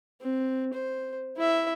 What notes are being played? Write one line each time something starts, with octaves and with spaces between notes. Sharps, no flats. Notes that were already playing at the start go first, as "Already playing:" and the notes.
C4
C5
E4 E5